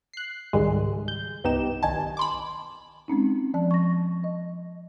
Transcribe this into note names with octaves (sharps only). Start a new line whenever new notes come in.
F#6 C7
C#2 G#2 D#3 G3 G#3
G6
C2 G2 B3 D#4 G4 E7
B1 D#3 G#5 A5
B5 C6 D6
G#3 C4 C#4 D#4
F3 D5 A5
C#6 A#6
D#5